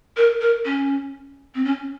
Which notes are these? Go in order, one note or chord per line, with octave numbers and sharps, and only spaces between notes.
A#4
A#4
C#4
C4
C#4